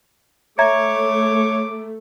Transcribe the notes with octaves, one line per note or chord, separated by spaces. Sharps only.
A3 C#5 E5 A#5 D6 G#6